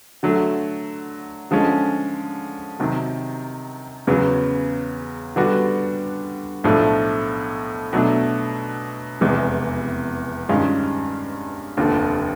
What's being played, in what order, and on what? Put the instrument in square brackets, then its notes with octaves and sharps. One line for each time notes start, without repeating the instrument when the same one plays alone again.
[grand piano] D3 F#3 A3
D3 F3 G#3 C#4
C3 D#3 F#3
E2 C#3 F#3 B3
D3 G3 B3 D4 F#4
B1 A2 F3 A3 D4
B2 F#3 A3 D4
F1 E2 C3 E3 G#3
G2 D#3 G#3 C#4 F4
F1 D#2 D3 F3